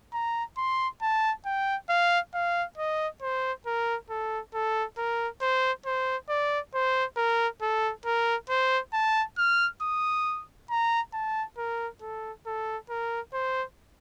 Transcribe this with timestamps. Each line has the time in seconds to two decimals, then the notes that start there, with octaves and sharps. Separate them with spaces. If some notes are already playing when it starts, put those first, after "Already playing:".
0.13 A#5
0.57 C6
1.02 A5
1.45 G5
1.89 F5
2.34 F5
2.77 D#5
3.22 C5
3.66 A#4
4.10 A4
4.54 A4
4.98 A#4
5.41 C5
5.86 C5
6.29 D5
6.74 C5
7.17 A#4
7.62 A4
8.05 A#4
8.49 C5
8.93 A5
9.37 F6
9.82 D#6
10.70 A#5
11.14 A5
11.58 A#4
12.01 A4
12.46 A4
12.90 A#4
13.33 C5